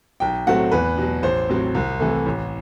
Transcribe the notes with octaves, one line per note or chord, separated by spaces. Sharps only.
B1 G5
A2 F#3 A3 C4 F#5
E2 B4
B2 F#3
A1 C5
A2 F#3 C4
C2
C3 E3 A3
A1